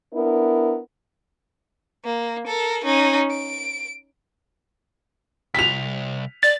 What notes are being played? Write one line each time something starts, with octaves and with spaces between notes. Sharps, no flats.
B3 D4 E4 A#4
A#3
A4 A#4
C#4 D#4
D7
C2 B6 F7
D5 A6